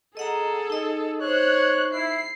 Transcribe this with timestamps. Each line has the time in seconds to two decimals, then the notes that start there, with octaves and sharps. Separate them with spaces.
0.17 G#4 A4 D#5 F#5 A#5
0.70 D#4 D#5
1.22 C5 C#5 F#6
1.93 E4 C7